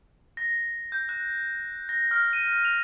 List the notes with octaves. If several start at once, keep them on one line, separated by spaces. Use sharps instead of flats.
A#6
G6
F#6
A#6
F6
D#7
F7